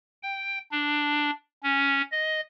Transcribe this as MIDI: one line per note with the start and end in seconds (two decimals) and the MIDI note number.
0.23 0.59 79
0.72 1.31 62
1.63 2.02 61
2.12 2.41 75